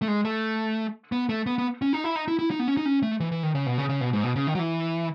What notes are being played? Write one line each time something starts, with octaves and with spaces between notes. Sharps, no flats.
A3
G#3
A3
B3
A3
B3
B3
C#4
D#4
E4
D#4
E4
E4
D#4
B3
C#4
D#4
C#4
A3
E3
E3
D#3
C#3
B2
C#3
C#3
B2
G#2
B2
C#3
D#3
F#3
E3